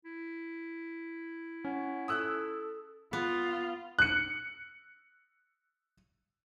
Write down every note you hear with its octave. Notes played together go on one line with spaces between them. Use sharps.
E4
C#4 F#5
A4 D#6 E6 F#6
B3 F4
F#6 C#7